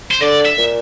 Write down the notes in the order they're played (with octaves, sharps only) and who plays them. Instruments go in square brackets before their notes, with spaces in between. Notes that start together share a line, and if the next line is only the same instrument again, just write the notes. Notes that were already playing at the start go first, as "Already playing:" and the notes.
[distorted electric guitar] C5
[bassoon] D3 [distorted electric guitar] D5
[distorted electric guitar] E5
[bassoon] A#2